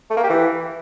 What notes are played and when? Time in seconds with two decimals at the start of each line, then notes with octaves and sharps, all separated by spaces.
0.11 A3
0.17 A#3
0.23 G4
0.30 E3